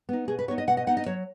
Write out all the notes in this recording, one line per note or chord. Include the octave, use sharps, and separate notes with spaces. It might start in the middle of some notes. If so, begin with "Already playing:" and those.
B3 D#4
B2 G#4
B4
B3 D#4 C#5
D#5
B2 F#5
D#5
B3 D#4 F#5
D#5
F#3 C#5